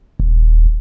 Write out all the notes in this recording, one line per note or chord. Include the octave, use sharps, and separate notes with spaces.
D#1